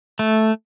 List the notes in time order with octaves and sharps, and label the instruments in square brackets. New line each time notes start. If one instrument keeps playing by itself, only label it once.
[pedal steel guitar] A3